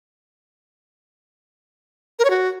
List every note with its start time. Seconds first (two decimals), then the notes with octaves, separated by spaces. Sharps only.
2.19 A#4
2.25 C#5
2.30 F#4